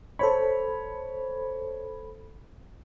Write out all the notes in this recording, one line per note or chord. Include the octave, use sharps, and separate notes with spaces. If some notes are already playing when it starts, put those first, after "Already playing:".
A4 C5 C#5 B5